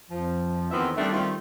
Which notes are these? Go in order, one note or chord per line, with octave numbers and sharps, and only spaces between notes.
F2 F3
E2 D#3 B3 C4 F4 E5
D#3 G3 A3 C4 D4
D#3 G3 A3 C4 F4